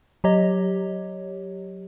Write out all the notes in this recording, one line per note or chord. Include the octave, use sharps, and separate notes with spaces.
F#3 G4 C#5 D#5